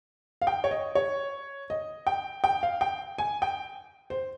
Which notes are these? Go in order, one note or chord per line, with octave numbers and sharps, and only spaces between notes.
F5
G5
C#5
D#5
C#5
D#5
G5
G5
F5
G5
G#5
G5
C5